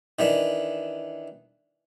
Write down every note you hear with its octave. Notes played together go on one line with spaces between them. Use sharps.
D#3 E3 D4